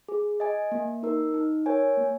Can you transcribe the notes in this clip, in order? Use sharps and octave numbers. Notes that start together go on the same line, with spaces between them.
G#4
D#5 G#5
A#3
D#4 A#4
D#4
A#4 C#5 G#5
A#3